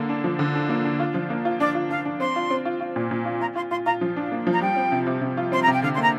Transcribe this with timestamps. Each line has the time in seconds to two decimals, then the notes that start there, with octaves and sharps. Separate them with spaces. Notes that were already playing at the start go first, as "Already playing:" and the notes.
Already playing: D3 A#3
0.09 D4
0.24 F3
0.39 D3
0.55 D4
0.69 A#3
0.84 D4
1.00 F4
1.14 F3
1.30 A#3
1.45 F4
1.60 D4 D5
1.75 F4
1.90 D4 F5
2.05 D4
2.20 C4 C6
2.36 F4
2.51 C4
2.65 F4
2.81 F4
2.96 A#2
3.11 A#2
3.26 F4
3.41 F4 A#5
3.56 F4 C6
3.71 F4 C6
3.86 F4 A#5
4.01 F3
4.16 D4
4.32 A#3
4.47 F3
4.53 A#5
4.61 G3 G5
4.76 C4
4.92 C3
5.07 C3
5.21 C3
5.37 F4
5.52 C4 C6
5.62 A#5
5.67 C3
5.73 G5
5.82 D3 F5
5.95 C6
5.97 A#3 A#5